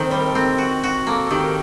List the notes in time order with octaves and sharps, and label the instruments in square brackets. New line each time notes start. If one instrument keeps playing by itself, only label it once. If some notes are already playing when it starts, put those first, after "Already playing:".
Already playing: [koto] D#3 C4 [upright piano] A4 A#4 C5
[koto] G3 [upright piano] C5
[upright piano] A#4
A4
[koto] C4 [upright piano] A#4
[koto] F#4
F#4
[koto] A#3 [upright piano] A4
[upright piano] A4
[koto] D#3 [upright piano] G4
[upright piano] A#4